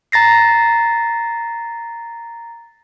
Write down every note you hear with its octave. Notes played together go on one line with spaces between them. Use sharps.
A#5 A6 A#6 C7